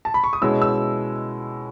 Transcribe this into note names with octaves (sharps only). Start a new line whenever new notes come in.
A5
B5
C#6
D#6
B2 G#3 C#4 E4 E6
E6